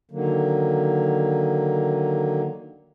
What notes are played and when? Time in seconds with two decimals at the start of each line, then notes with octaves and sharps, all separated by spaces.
0.11 D3 D#3 F#3 A#3